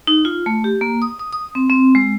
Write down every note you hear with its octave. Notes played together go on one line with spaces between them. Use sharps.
D#4
F4
A3
G4
A#3
D#6
D#6
D#6
C4
C4
G#3